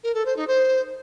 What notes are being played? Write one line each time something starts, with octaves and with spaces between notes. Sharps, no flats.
A#4
A4
C5
D#4
C5